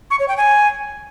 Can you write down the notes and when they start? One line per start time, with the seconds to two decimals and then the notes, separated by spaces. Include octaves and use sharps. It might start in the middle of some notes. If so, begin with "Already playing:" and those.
0.11 C#6
0.19 C#5
0.28 G5
0.37 G#5